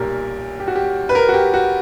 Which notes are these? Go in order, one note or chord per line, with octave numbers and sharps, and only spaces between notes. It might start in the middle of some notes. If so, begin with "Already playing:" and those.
Already playing: B1 A#2 G3 G4 A#4
G4
F#4
G4
B4
A#4
F#4
G4
F#4